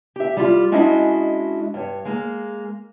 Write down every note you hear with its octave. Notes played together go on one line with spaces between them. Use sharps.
G4 E5
G3 F4
G#3 C#4 D4 E4 F#4 D#5
G2 C#5
G#3 A#3